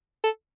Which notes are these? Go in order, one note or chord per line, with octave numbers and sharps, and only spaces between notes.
A4